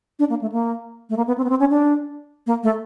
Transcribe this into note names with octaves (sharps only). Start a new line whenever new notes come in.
D4
A#3
A3
A#3
A3
A#3
B3
C4
B3
C4
C#4
D4
A#3
A3